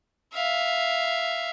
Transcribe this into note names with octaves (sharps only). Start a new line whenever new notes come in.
E5 F5